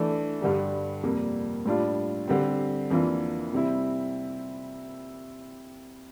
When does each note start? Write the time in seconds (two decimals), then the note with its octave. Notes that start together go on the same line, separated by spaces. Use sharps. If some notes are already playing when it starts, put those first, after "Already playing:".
Already playing: E3 A3 D4
0.41 G2 D3 G3 D4
1.03 F2 C3 G3 A#3
1.65 A2 G3 D4 F4
2.28 D3 G3 C4
2.90 F2 E3 A#3 D4 F4
3.53 C3 G3 C4 E4